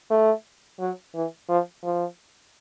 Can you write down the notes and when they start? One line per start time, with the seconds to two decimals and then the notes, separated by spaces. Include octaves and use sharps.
0.10 A3
0.79 F#3
1.14 E3
1.49 F3
1.84 F3